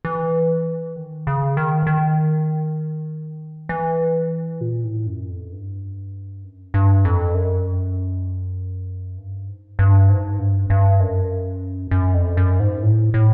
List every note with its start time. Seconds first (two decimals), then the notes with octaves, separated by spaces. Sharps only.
0.05 E3
0.96 D#3
1.27 C#3
1.57 D#3
1.87 D#3
3.69 E3
4.61 A#2
4.84 A2
5.07 F#2
5.29 F2
5.53 G2
6.44 F#2
6.74 G2
7.05 F2
7.35 F#2
9.18 G2
9.48 G#2
9.79 G2
10.09 G#2
10.39 G2
10.70 G2
11.00 F#2
11.91 F#2
12.14 F2
12.37 F#2
12.60 G#2
12.83 A2
13.14 A2